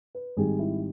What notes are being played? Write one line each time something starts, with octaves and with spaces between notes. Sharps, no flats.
B4
G#1 G#2 G3 G#4
E4